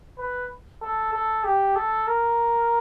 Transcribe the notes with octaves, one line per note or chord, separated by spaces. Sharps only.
B4
A4
A4
G4
A4
A#4